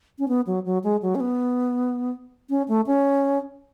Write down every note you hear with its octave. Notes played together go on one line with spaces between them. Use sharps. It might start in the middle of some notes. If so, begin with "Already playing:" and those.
C#4
B3
F#3
F#3
G#3
F#3
C#4
B3
C#4
A3
C#4